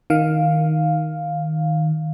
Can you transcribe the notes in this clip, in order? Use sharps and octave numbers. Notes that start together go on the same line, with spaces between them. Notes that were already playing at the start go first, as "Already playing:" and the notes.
D#3 F5